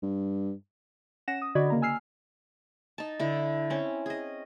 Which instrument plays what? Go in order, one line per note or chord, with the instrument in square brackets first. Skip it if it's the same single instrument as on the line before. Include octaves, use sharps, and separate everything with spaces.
[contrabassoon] G2
[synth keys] C#4 F#5 A#6 E7
D#6
D3 F#4 D5 D#5 B5 G#6
C#3 A#3 A#5
G#5 E6 F6 C7
[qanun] D#4 A5
D3 E4
C4 C#4
G#4 D#5